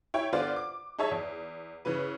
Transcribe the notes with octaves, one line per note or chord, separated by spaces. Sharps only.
E4 C#5 G5
D3 B3 F4 C5 D5
D6
D#4 G#4 C#5 E5 A5
E2
C#3 E3 B4